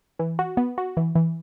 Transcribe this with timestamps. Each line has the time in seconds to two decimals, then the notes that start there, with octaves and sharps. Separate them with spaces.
0.19 E3
0.39 F#4
0.57 B3
0.78 F#4
0.97 E3
1.15 E3